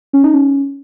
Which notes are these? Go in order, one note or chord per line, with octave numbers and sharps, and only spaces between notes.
C#4
D#4
C#4